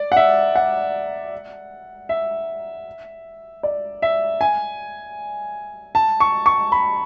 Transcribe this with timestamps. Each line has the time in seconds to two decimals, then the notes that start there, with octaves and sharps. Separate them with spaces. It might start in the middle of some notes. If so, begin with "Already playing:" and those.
Already playing: D5
0.12 F#5
0.16 E5
0.55 F#5
2.09 E5
3.63 D5
4.02 E5
4.41 G#5
5.95 A5
6.20 C#6
6.46 C#6
6.72 B5